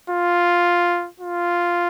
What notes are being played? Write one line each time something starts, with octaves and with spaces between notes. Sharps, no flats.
F4
F4